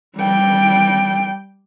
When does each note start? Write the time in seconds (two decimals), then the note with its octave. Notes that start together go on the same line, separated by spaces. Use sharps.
0.17 G3 G5